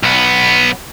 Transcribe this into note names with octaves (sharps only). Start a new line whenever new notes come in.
B1 B3